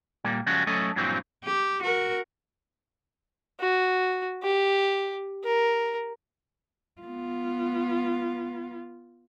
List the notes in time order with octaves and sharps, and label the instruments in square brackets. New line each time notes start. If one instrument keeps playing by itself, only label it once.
[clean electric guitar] A#2 G3 A#3
C#3 F3 G3 G#3 C#4 F#4
F#3 A3 C#4 A4 D#5
G2 A#2 E3 F#3 C4 D#4
[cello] G4
F#4 A#4
[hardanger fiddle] F#4
G4
A#4
[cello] B3 F4